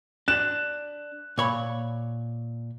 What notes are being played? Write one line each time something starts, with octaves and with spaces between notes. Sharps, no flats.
D4 F#6 E7
A#2 C#5 B5